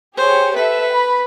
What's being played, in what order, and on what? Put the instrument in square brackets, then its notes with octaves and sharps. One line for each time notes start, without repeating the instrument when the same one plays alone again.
[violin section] G4 G#4 C#5 [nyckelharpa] C5
[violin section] A4 E5 [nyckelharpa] B4
[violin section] B5